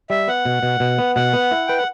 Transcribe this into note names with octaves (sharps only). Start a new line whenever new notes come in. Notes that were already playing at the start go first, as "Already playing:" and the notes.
G3 E5
B3 F#5
B2
B2
B2
B3
B2 F#5
B3
E4
B4 G5
F#5